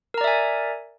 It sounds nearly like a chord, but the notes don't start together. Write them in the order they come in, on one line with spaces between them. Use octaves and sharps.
A#4 A#5 D5 E5 G#5